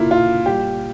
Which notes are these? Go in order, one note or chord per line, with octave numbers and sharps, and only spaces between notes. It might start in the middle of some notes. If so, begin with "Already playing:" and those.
Already playing: A#2 A#3 E4 F4
A#2 F4
G3 G4